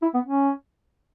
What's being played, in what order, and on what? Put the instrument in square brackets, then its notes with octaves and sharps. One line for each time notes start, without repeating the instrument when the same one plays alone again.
[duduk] E4
B3
C#4